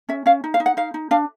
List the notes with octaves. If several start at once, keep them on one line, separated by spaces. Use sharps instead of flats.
C#4 E5
C#4 F5
D#4
F5
D#4
F#5
D#4 F5
D#4
D4 F5